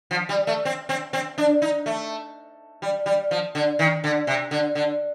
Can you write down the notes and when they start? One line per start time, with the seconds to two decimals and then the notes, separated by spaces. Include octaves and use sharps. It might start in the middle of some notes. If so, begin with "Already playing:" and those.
0.11 F3
0.29 G3
0.47 A3
0.65 C4
0.89 C4
1.13 C4
1.38 D4
1.62 D#4
1.86 A3
2.82 G3
3.06 G3
3.31 F3
3.55 D3
3.79 D#3
4.04 D3
4.27 C3
4.51 D3
4.75 D3